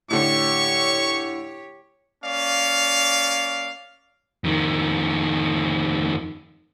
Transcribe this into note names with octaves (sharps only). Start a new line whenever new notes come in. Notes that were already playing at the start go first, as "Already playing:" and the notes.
A2 D3 G4 C#5 C#6
A#3 C#4 D5 F5
F2 D#3